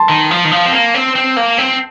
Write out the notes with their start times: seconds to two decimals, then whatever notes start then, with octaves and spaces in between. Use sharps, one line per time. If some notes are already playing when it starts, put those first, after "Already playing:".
Already playing: A5 C6
0.09 D#3
0.31 F3
0.45 D#3
0.51 F3
0.66 C4
0.73 A#3
0.94 C4
1.16 C4
1.37 A#3
1.58 C4